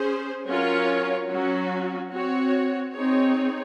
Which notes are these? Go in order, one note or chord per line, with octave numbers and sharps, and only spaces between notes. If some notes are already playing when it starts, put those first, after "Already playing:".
Already playing: C#4 G#4 C5
F#3 C#4 F4 A#4 C#5
F#3 C#4 F#4
C4 F#4 C#5
C4 D#4 G#4 C#5